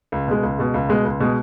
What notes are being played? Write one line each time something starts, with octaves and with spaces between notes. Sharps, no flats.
C#2
B2 G#3
C#2
B2 G#3
C#2
B2 G#3
C#2
B2 G#3